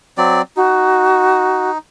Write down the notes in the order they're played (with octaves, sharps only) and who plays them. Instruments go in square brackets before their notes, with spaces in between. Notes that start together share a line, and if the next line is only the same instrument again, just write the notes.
[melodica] F#3 C4 D5
[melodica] D#4 [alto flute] F#4